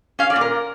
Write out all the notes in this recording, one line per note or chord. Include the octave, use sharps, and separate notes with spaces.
C#4 F5
D5
A#2
A#4